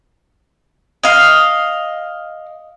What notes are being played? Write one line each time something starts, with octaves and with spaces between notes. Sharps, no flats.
D#5 F5